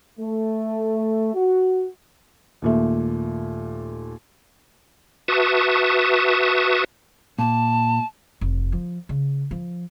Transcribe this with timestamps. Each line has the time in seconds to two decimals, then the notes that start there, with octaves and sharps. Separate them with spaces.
0.19 A3
1.34 F#4
2.62 D#2 A#2 A3
5.28 F#4 B4 E5 A5 C#6 D#6
7.39 A#2 A5
8.41 F1
8.72 F3
9.09 C#3
9.51 F3